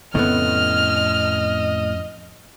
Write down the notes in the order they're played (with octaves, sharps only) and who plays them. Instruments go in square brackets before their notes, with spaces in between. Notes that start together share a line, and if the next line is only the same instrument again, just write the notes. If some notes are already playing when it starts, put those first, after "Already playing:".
[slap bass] F2 C#3 C4 [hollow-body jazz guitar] A2 A3 B3 [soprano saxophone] D#5 [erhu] F6